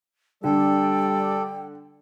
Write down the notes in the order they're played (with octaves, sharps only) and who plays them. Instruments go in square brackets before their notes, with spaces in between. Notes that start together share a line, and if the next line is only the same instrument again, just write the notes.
[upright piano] D3 [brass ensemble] G3 D5 [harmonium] A4 [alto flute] G5